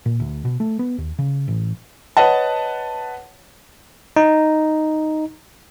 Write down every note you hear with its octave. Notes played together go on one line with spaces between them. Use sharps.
A#2
D2
B2
A3
B3
D#2
C#3
A1
B4 C#5 D#5 F#5 A5
D#4